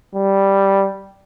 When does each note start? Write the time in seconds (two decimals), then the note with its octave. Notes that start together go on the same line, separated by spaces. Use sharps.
0.15 G3